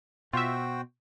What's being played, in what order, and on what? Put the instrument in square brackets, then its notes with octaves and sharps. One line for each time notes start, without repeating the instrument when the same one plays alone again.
[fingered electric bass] B2 [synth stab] F4 E5 [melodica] F#4 C5 G5